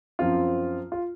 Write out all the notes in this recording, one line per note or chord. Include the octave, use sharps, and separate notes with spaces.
F#2 F3 C4 F4
F4